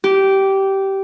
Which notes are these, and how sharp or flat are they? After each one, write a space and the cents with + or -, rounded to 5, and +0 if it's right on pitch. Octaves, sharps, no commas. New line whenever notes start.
G4 -15